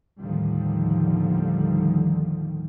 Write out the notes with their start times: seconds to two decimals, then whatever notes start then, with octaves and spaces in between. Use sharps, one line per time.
0.19 D#2 A2 D3 D#3 F3 G3